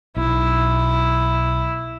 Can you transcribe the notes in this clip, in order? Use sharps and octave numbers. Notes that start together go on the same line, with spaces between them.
B1 E4